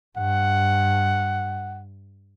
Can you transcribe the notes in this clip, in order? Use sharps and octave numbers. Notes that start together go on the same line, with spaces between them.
G2 F#5